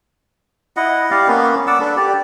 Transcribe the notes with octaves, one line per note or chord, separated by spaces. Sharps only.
E4 D#5 F#5
G4 D5 F5
A#3 B3 C#4 B4
D5 F#5 D6 E6
D4 A4 B4
G4 D5